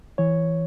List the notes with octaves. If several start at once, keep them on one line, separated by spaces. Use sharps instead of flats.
E3 C#5